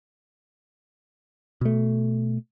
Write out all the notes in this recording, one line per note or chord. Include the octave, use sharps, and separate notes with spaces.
B2 A3